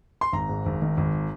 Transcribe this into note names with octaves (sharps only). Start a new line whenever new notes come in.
C6
G#1 A#5
G#2
G#1
D#3
G#1